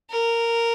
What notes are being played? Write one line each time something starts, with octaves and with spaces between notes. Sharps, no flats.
A#4